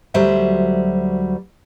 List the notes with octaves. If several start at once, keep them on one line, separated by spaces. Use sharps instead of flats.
D2 F#3 G3 C5 E5